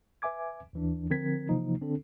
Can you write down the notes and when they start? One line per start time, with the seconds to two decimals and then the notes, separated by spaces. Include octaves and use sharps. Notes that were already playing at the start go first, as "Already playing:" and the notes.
0.22 B4 E5 G#5 D6 G#6
0.73 D#2 E3 D4
1.10 D3 F3 C4 A#4 G#6 B6
1.49 C3 E3 F3 A#3 D#4
1.81 D3 C4 D4 A4